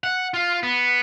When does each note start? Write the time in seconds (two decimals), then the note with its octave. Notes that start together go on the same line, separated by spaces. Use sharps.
0.04 F#5
0.34 F4
0.63 B3